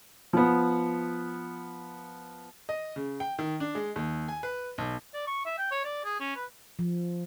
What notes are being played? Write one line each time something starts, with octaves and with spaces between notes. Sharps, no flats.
F3 B3
D#5
C#3
G5
D#3
D4
G#3
D#2
G#5
B4
B1
D5
C#6
E5
G5
C#5
D5
G#4
C#4
B4
F3